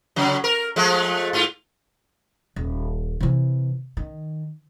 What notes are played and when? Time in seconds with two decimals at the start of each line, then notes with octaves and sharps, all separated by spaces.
0.16 A2 C#3 F#3
0.44 A#4
0.76 F3 G#3 A3
1.33 G#2 F4
2.56 D#1
3.20 C3 E3
3.97 D#3